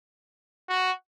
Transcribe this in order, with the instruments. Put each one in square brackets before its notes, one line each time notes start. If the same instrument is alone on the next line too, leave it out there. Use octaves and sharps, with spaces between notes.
[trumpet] F#4